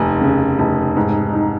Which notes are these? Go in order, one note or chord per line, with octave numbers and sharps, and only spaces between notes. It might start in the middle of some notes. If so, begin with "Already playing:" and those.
Already playing: F1 D#2 G#5
C#3
F1
G#2
D#4